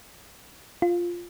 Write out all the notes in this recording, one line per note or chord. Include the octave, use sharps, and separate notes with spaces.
F4